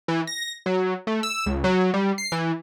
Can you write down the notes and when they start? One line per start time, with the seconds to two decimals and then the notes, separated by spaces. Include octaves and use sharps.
0.08 E3
0.27 A#6
0.66 F#3
1.07 A3
1.23 E6
1.46 C#2
1.64 F#3
1.94 G3
2.18 C7
2.32 E3